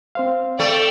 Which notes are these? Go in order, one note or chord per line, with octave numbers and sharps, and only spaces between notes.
C4 C5 F5
A3 D5 G5